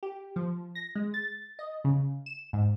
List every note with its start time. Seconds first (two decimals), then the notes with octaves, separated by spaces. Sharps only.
0.03 G4
0.36 F3
0.75 A#6
0.95 G#3
1.14 A6
1.59 D#5
1.84 C#3
2.26 E7
2.53 G#2